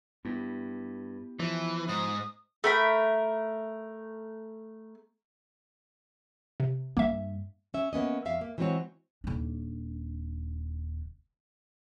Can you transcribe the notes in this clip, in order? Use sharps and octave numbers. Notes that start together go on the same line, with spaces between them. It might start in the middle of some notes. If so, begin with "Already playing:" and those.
G2 B3 E4 G4
E3 F3
G#2 D#6
A3 A#4 B5
C3
G2 A#3 E5
C#4 E5
A#3 B3 C#4 D#5
F2 E5 F5
A#3
E3 F#3 G#3 C4 F#4 C#5
D#1 D4